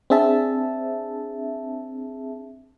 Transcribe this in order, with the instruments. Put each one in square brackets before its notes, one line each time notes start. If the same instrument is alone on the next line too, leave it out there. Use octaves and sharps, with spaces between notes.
[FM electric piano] C4 D4 G#4 E5 A5